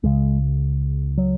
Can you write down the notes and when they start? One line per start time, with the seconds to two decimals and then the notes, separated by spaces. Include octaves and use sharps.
0.03 C#2 C#3 G#3
1.18 F#3